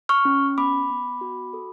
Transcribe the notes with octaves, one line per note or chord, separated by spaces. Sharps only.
C#6 F6
C#4
B3 B5 D6
B3
F#4
A4